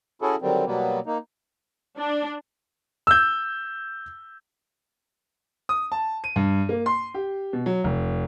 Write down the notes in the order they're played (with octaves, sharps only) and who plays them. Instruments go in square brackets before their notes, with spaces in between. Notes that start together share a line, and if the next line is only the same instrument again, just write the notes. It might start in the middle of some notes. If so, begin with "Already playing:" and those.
[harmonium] C#4 E4 F#4 G#4 A4
D3 D#3 F#3 G3 C4
B2 F#3 G3 A#3 B3
A#3 D#4
[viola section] D4
[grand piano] E6 G6
D#6
A5
D#7
G2
A#3
C6
G4
B2
F#3
F1